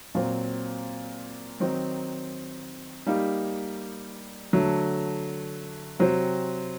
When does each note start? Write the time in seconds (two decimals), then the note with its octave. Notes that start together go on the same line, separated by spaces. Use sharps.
0.15 A#2 F#3 C4
1.60 D#3 F#3 C4 D#4
3.06 G3 A#3 D#4
4.53 D3 F#3 A3
5.99 C3 F#3 C4 F#4 C5